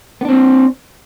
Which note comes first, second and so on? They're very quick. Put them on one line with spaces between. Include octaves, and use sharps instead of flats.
B3 D4 C4